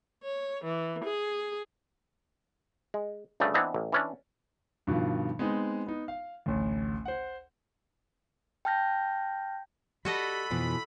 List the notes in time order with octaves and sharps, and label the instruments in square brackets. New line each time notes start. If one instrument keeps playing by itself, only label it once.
[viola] C#5
E3
G#4
[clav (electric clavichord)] G#3
D2 G2 C#3 G3 A3
E3 B3 C4 D4 D#4 E5
A1
E3 C#4 D4
[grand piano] G2 B2 D#3 F3 F4
G#3 B3 C4 D#4
B3 D#4
F5
A1 D2
C5 F#5
[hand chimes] G5 A5 F6 G6 A#6
[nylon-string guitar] G3 [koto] F#4 A4 D#5 [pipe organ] B5
[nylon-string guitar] F2 E3 [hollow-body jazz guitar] B2 F3